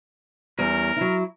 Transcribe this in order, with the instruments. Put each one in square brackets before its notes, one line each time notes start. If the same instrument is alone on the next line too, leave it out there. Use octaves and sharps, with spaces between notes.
[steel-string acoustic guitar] E2 G3 C#4 [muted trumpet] A#4
[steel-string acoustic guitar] F#3 E4